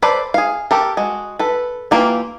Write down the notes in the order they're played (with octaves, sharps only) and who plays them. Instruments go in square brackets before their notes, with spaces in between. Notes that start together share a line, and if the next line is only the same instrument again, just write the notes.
[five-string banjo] A4 B4 C5 D5 B5
G#4 F5
G4 A4 A#4
G#3 F#4
A4 B4
E3 A#3 F4 G4